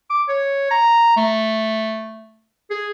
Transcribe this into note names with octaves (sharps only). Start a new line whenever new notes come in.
D6
C#5
A#5
A3
G#4